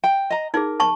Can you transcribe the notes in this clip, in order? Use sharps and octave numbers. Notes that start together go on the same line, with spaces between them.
G5
D#5 A#5
D#4 G#4 A#4
A5 C#6